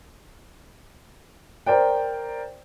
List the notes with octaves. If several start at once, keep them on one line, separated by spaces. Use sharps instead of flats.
A#4 C5 D5 G5